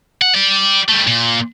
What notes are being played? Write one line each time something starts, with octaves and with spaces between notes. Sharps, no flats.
F#5
G4 D5
G3 A3
A#2